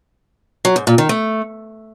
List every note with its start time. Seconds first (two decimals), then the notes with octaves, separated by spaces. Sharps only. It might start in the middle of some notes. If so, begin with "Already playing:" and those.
0.65 F#3
0.76 G#2
0.87 A#2
0.98 D#3
1.09 A3